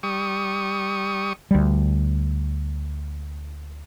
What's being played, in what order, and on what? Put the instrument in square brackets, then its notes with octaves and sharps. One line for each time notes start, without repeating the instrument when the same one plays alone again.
[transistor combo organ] G3 C#6 D#6
[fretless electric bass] D2 G3